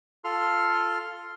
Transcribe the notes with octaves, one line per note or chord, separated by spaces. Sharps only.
F4 A4 C6 F6